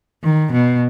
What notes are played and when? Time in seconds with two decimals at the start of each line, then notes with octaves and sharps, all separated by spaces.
0.24 D#3
0.53 B2